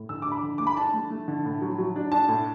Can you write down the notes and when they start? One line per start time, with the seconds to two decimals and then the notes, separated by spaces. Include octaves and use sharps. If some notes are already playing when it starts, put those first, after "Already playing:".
Already playing: A2
0.09 D3 E6
0.22 D4 D6
0.32 B5
0.43 D3
0.58 A3 D6
0.67 B5
0.77 D4 A5
0.94 A3
1.10 A3
1.28 D3
1.45 A2
1.61 F#3
1.79 F#3
1.96 D4
2.12 D4 A5
2.28 A2